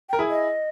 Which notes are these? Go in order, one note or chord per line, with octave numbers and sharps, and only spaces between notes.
G5
A#4
E4 G#4
D#5